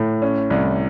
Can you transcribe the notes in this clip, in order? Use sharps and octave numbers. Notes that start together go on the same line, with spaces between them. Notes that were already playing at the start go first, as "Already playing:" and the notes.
Already playing: A2
C#4
C2